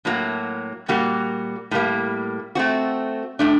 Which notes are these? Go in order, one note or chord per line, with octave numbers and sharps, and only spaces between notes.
A2 F#3 A#3 F#4
A#2 G3 A#3 F#4
A2 G3 A#3
A3 C4 F#4
A2 A3 D4